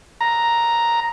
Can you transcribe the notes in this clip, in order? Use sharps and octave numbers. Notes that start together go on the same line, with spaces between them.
A#5